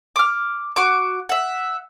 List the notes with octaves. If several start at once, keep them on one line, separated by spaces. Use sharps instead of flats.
D6 F6
F#4 D6
E5 F#5